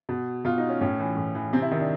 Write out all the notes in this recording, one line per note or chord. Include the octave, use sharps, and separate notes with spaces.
B2
B2 F4
D#4
C#4
A2 C#4
E3
A2
E3
C3 C4
E4
D#3 D#4
D4